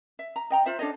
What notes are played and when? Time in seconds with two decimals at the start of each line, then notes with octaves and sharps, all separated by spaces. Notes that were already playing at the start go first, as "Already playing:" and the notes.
0.19 E5
0.36 A#5
0.50 D#5 G5 A#5
0.66 F4 C5 E5
0.79 D4 A4 C#5 D#5